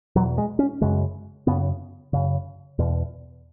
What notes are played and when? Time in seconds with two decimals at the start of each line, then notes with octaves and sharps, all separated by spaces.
0.16 E2 B2 F#3
0.38 G#3
0.59 C#4
0.81 F#2 C#3 G#3
1.47 F#2 C#3 B3
2.13 F#2 C#3
2.79 E2 B2